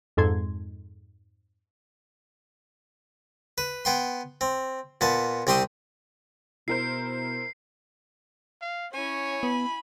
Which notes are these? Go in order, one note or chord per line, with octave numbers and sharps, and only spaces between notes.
F2 G#2 A4 C6 G#6
B4
B3 G5 C6
C4
A#2 B3 A5
C2 C4 G4 C6 D#6
B2 E4 A#4 C5 C7
F5
C#4 E4 C#5 G#5
B3 B5